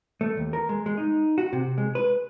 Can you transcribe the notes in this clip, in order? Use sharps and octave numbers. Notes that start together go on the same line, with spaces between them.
A3
D#2
A#4
G#3
G#3
D#4
F#4
C3
G#3
B4